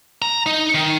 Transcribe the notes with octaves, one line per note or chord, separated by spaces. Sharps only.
A#5
D#4
D#3